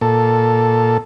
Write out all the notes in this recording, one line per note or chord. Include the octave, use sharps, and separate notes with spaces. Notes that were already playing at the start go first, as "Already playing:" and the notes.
A#2 A4